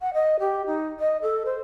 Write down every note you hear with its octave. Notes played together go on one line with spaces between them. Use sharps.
F#5
D#5
G4
D#4
D#5
A4
C5